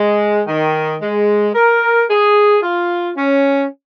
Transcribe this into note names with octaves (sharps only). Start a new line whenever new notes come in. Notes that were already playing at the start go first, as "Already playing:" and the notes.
Already playing: G#3
D#3
G#3
A#4
G#4
F4
C#4